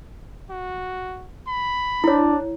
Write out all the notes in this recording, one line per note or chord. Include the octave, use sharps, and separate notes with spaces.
F#4
B5
D4 E4 C#5